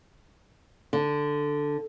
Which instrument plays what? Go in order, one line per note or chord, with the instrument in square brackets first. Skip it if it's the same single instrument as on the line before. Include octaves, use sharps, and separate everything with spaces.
[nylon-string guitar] D3